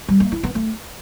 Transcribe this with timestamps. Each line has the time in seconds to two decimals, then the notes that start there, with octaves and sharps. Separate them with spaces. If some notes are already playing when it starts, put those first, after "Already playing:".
0.08 G3
0.20 A#3
0.32 E4
0.43 B3
0.55 A3